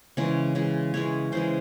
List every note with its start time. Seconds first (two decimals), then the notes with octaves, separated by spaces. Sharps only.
0.17 C#3 E3 G#3 C#5
0.55 C#3 E3 G#3
0.94 C#3 E3 G#3 C#5
1.32 C#3 E3 G#3 C5